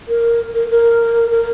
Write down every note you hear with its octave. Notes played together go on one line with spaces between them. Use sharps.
A#4
A#4
A#4
A#4